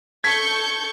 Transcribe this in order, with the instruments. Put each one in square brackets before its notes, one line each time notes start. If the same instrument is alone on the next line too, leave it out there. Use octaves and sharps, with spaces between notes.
[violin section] A4 C#6 G6 [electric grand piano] G#6 B6